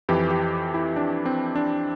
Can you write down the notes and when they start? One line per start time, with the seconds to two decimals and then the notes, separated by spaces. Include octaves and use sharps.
0.09 F2 E3 G4
0.31 G4
0.74 E4
0.96 D4
1.26 C4
1.56 D4